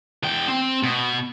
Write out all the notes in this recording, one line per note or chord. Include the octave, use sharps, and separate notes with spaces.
E2 G5
C4
B2